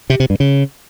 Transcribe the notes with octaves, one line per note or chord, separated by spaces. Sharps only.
C3
C3
G2
C#3